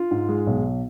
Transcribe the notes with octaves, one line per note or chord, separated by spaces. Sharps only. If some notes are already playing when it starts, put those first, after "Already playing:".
Already playing: F4
G#2
G#3
B1